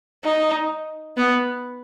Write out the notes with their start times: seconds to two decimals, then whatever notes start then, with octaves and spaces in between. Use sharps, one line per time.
0.24 D#4
1.17 B3